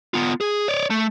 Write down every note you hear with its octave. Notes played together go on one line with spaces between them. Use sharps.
B3 F4
G#4
C#5 D5
A3